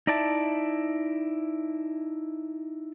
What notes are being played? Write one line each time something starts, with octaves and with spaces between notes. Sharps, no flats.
D#4 E4 D5 E5 A5